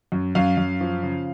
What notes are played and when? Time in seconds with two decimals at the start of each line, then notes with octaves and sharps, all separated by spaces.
0.12 F#2
0.35 F#2 F5
0.57 F#2
0.81 F3
1.03 C#3